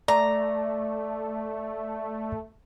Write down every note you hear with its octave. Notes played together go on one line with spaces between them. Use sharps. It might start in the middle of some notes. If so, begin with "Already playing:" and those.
A3 D5 A#5